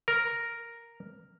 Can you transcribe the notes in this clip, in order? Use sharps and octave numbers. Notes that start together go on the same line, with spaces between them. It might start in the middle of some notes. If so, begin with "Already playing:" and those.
A#4